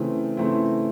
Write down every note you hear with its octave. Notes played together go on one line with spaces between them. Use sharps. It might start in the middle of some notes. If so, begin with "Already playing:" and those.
Already playing: C#3 E3 A3 C4 E4
C#3 E3 A3 C4 E4